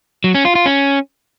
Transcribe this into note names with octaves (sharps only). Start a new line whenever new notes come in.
F#3
C#4
F4
F4
C#4